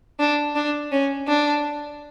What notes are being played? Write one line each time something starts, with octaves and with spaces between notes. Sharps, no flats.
D4
D4
C#4
D4